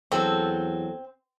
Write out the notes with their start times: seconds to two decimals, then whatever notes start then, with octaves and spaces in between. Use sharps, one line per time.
0.12 E2 F#3 C4 A4